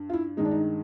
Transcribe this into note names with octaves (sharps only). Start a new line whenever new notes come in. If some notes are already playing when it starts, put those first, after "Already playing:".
Already playing: G2
F4
E4
G2 D#3 G#3 D#4
D4
D#4